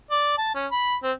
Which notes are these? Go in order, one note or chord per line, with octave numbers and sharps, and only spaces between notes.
D5
A5
C#4
B5
C4